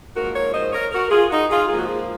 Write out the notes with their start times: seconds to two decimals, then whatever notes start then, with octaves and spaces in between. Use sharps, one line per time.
0.16 G#2 F3 A#3 F#4 A#4
0.35 A#4 C#5
0.54 C5 D#5
0.72 A#4 C#5
0.92 F#4 A#4
1.10 F4 G#4
1.29 D#4 F#4
1.50 F4 G#4
1.68 G#2 F3 A#3 F4 G#4
1.78 F#4
1.87 F4 G#4